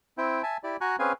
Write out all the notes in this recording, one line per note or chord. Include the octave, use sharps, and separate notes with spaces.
C4 E4 G5
E5 G#5 A5
E4 G4 D5
F#4 G#5 A#5 C#6 F#6
C4 C#4 G#4 B4 F5 G#5